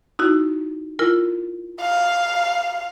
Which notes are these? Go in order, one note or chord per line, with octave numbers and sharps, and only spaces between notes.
D#4 E4 F#4
E4 F4 A#4
F5